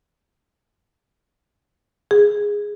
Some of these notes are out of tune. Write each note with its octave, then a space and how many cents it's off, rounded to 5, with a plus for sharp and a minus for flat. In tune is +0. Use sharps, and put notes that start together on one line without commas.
G#4 -5